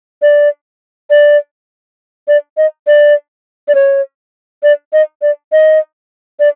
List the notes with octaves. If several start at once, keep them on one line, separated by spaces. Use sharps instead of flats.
D5
D5
D5
D#5
D5
D5
C#5
D5
D#5
D5
D#5
D5